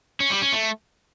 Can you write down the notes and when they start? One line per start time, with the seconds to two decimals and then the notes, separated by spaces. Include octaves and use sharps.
0.20 C#4
0.31 G3
0.42 C#4
0.52 A3